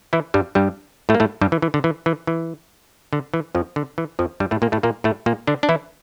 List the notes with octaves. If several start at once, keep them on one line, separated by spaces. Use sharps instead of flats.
E3 E4
G2 G3
G2 G3
A2 A3
A#3
A2 A3
G2 G3
E3
E3
D3
E3
E3
E3
D3
E3
F2 F3
D3
E3
F2 F3
G2 G3
A2 A3
A#2 A#3
A2 A3
A#2 A#3
A2 A3
A#2 A#3
D3 D4
D4
E3 E4